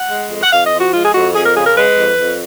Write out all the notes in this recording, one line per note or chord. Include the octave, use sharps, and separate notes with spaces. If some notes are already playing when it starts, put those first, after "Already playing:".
Already playing: F#5
G#3
F2
F#5
F2 F5
D#5
F3
F#4
G#3 F4
G#4
F2 F#4
F2 G#4
A#4
C#3 G#4
A#4
G#3 B4
F2
F2